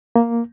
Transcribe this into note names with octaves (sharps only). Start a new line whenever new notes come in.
A#3